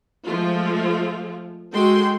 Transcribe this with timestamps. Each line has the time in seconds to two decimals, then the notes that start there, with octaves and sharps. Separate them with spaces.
0.25 F3 G#3 A3 F4
1.72 G#3 F#4 A4 G5 C6